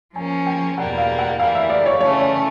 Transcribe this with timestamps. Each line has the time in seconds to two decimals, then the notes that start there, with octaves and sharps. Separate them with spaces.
0.15 F3 A#3 C#4 G#5
0.47 G5
0.78 E2 B2 G3 A#3 F#5
0.98 F5
1.19 F#5
1.40 E3 G3 A#3 F5
1.55 E5
1.70 D5
1.86 C#5
2.00 C#3 E3 A3 C#4 C#5
2.21 C#5